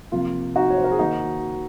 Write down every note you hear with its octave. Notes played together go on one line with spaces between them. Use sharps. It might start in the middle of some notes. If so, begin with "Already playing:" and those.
C3 F3 A#3 F4
D#4 F#4
C#5
C5
A#4
G#4
D#3 A#3 D#4 F#4